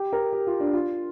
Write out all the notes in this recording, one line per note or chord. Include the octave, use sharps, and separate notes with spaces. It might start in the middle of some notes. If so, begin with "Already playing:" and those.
Already playing: G4
A#4
G4
F4
D4
F4